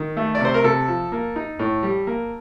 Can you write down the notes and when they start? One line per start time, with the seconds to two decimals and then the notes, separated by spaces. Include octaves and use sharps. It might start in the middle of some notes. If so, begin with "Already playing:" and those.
Already playing: D#3
0.17 A3
0.35 D5
0.41 C3 C5
0.54 A#4
0.64 C3 A4
0.88 F3
1.12 A#3
1.36 D#4
1.59 A2
1.83 G3
2.07 A#3